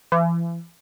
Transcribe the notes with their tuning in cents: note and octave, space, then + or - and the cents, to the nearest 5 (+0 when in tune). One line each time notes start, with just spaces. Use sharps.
E3 +40